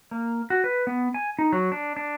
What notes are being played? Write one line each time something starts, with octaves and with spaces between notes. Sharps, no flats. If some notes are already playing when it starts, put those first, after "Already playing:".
A#3
F#4
B4
B3
G#5
D#4
F#3
D4
D4